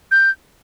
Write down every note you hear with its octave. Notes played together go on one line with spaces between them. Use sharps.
G6